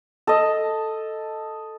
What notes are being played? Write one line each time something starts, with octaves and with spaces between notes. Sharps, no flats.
A4 D#5